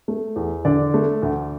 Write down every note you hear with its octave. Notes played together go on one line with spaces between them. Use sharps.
A3
E2
D3 D5
A3
D2